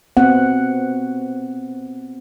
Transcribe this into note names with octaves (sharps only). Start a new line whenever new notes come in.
B3 C4 F#5